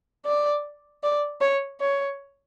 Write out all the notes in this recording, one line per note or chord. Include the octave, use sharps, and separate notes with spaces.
D5
D5
C#5
C#5